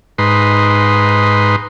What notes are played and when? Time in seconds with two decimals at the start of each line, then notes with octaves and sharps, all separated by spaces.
0.18 G#2 D#4 B4 C6